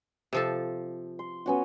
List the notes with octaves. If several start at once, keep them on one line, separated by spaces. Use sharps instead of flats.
C3 F3 A4
C6
B3 C#4 F#4